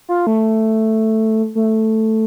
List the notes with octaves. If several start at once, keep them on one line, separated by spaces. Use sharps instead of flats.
F4
A3
A3